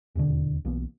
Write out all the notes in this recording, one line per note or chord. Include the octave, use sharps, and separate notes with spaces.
D#1 E2 B2 D3
B1 E3 A#3 B3